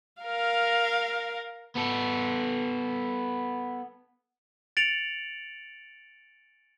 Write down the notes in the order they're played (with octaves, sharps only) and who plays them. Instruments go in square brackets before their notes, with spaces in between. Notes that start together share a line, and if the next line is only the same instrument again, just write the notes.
[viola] A#4 F5
[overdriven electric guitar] B3 A4
[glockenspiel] A6 C#7 D7 F7 F#7